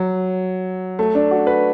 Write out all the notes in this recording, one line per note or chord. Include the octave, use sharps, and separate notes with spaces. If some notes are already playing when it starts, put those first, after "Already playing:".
Already playing: F#3
A3
D4
F#4
B4